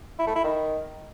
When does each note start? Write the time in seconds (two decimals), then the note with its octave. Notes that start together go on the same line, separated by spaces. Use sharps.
0.19 E4
0.27 A3
0.36 E4
0.44 D#3